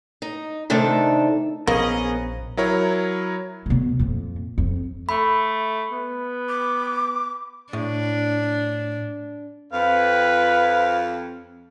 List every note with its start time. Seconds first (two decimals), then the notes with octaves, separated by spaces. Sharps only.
0.22 D#4
0.70 C3 D#3 A3 D4 D#4 A4
1.67 A#1 F3 A#3 B3 C#4 G#4 A#4 D#5
2.57 F#3 E4 A#4 C#5
3.66 D2 B2
3.99 F2 A#2
4.58 F2
5.09 A3 B5
5.92 B3
6.49 D6
7.73 A2 D4
9.73 F2 B4 F5